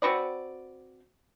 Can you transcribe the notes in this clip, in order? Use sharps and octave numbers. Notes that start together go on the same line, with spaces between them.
C4 F#4 B4 D5